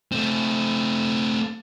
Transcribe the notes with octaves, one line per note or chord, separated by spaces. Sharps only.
A3 C4